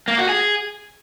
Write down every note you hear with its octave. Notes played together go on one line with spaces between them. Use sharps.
A#3
F#4
G#4